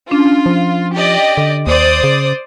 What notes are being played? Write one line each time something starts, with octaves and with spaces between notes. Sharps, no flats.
C#4 D4 F4
F3
G4 D5 D#5
D3
D#2 C5 D5 D#6
C#3